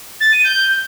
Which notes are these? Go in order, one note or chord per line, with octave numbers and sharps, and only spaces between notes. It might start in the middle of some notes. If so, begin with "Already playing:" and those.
A6
D#7
G6